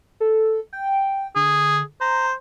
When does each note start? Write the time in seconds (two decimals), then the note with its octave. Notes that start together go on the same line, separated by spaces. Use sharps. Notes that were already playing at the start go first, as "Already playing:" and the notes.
0.20 A4
0.73 G5
1.36 D3 G#4
2.01 C5 A#5